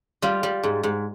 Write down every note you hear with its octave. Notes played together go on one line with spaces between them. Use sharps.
G3 F4
G3
G#2
G#2